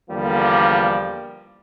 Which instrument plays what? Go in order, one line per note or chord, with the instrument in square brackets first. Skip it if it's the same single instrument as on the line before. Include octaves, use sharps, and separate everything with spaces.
[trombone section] E2 D3 F3 G3 A#3